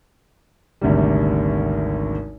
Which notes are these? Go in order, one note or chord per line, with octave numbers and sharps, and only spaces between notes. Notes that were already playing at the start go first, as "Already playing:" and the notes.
G#1 D2 C3 G3